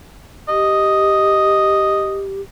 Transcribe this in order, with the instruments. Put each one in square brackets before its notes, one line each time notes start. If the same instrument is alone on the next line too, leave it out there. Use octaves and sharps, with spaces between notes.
[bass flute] G4 [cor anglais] D#5